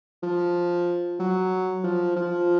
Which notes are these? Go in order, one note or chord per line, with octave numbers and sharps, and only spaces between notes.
F3
F#3
F3
F3